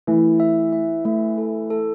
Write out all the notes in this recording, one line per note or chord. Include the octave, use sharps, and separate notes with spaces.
E3 A3
E5
E5
A3
A4
A4